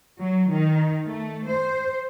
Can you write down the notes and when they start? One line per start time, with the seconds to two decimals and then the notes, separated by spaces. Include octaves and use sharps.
0.20 F#3
0.51 D#3
1.06 A3
1.47 C5